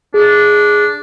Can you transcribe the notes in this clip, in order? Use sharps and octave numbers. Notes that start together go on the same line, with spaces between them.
D4 G#4